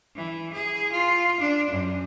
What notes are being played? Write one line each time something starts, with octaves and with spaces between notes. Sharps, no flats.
E3
G#4
F4
D4
F#2